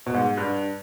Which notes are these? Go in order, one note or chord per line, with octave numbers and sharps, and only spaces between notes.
B2
G#2
G2